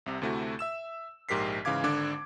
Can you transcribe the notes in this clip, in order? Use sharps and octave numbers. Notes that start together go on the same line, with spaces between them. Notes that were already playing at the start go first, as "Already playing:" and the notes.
C2 C3
D2 C3 A3 E4 F#4
E5 E6 E7
A#1 G#2 G4 A#4 B6 C7
G#2 C#3 E3 F5 D6 G#6
G#1 D3 D4 D6 G#6